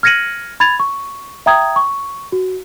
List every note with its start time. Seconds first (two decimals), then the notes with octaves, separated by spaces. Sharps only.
0.03 F6 G#6 A#6 C#7 D#7 F#7
0.60 B5 G#6 A6 F7
0.80 C#6
1.46 E5 G5 A#5 D#6 G#6
1.76 C#6
2.32 F#4